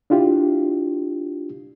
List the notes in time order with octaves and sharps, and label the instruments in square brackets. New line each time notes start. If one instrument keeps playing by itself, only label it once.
[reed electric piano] D4 E4 F4 G4